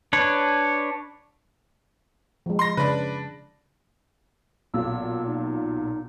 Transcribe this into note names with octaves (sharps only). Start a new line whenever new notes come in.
D4 B4 C#5
F3 G#3
C6 A#6
C#3 D4 B4
B1 A#2 F#3 E6
D#4